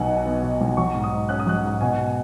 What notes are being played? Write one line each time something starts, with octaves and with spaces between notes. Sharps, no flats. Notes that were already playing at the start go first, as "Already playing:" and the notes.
Already playing: B1 B2 F#5 G#5
D#4
B3
B2
B1
F#3 C#6
G#2
D#6
G#2
C#4 F#6
D#6
F#3 F#6
G#2
B2 G#5